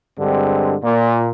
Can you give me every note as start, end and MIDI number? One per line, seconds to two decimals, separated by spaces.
0.18 0.75 43
0.18 0.75 50
0.18 0.75 56
0.18 0.75 60
0.83 1.30 46